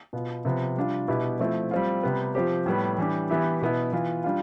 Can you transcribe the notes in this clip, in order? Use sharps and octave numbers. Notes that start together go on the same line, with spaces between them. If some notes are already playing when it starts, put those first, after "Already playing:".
B2 B3 F4
C3 F3 B3
G3 D4 F4
B2 B3 E4 G4
F3 A3 C4 E4
G3 C4 F4
C3 G3 B3
F3 C4 G4
A2 G3 B3
E3 G3 D4 G4
E3 B3 E4 G4
B2 B3 E4
E3 B3 F4
G3 D4 F4